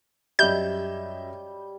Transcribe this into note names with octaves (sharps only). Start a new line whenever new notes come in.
F#2 G3 D#5 E5 G6